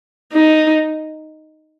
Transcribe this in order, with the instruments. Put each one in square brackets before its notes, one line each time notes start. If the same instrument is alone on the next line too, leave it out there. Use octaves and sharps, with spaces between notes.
[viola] D#4